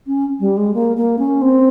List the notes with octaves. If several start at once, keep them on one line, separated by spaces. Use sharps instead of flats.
C#4
G3
G#3
A#3
A#3
C#4
C4